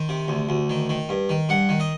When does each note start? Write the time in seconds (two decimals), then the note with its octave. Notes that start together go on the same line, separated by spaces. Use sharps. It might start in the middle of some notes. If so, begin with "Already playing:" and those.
Already playing: D#3 C5
0.09 C3
0.28 D2
0.49 D2
0.70 D#3
0.89 D#3
1.09 G2
1.29 D#3
1.49 G2 F#5
1.69 D#3
1.80 D#5